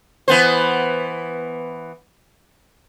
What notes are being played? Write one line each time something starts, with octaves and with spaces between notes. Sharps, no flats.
E3 B3 C5